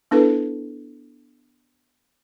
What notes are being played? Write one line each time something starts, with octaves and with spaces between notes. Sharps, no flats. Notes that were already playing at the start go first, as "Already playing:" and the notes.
B3 D4 E4 A4 B4